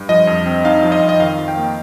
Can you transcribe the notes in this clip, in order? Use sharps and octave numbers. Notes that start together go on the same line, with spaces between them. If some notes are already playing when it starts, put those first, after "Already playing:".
Already playing: G2
F3 D#5
F2
C4
D#4 F5
F3
D#5
F2
D#5
D#3 F5
F2
G5
A#3